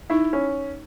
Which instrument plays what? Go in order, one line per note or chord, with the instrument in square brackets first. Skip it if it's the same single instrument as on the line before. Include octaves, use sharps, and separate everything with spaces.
[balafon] D#4 [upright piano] E4
[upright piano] C#4